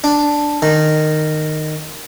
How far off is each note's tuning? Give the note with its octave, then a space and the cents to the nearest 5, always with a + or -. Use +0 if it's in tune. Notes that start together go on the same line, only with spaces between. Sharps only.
D4 +0
D#3 -15